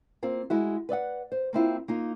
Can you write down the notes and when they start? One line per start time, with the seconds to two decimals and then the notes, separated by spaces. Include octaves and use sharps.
0.23 A#3 C4 F4
0.50 G#3 E4 F#4
0.89 B4 D5 D#5 F#5
1.32 C5
1.53 A#3 C4 E4 F4
1.88 A#3 D#4 F4